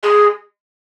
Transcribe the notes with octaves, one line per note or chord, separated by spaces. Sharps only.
G#4